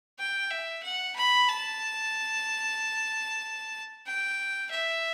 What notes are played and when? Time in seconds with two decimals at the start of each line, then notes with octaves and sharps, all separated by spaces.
0.18 G5
0.51 E5
0.83 F#5
1.16 B5
1.48 A5
4.06 G5
4.71 E5